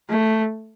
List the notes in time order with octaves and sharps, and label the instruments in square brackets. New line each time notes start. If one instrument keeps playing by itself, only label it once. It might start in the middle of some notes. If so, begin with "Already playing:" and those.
[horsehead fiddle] A3